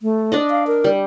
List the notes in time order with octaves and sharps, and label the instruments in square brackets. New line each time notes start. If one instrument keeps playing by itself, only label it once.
[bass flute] A3
[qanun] D4 D5 D#5
[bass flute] F5
A#4
[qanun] G3